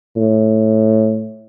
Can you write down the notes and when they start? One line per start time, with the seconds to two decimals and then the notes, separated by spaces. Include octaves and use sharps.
0.17 A2